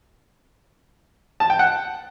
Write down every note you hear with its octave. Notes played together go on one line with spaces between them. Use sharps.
A5
G5
F#5